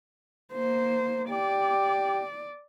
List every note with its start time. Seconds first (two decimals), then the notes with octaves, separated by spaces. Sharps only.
0.53 A#3 C5
1.30 G4 D5